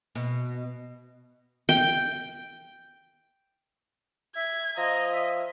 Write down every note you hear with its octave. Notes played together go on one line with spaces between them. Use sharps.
B2
G5
E5 G#6
F3 D#5 A#5
E5